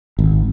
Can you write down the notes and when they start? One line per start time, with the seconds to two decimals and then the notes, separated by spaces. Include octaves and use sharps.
0.19 G#1